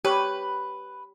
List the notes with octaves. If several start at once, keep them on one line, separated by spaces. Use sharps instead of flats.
G4 B4 C#5